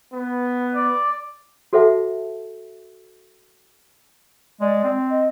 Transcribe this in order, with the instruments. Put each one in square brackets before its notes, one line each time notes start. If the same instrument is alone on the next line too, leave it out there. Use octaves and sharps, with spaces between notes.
[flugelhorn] B3
[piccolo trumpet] D5
[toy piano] F#4 A4 C5 E5 F#5 A5
[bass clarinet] G#3 [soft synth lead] D5
[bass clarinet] C4
[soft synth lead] D#5